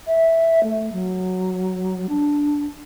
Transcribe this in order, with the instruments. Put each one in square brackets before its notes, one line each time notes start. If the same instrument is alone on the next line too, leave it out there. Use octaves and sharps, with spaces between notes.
[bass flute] E5
A3
F#3
D4